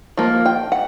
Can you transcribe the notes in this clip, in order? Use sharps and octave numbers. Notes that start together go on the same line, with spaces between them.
F3 A#3
G5
F#5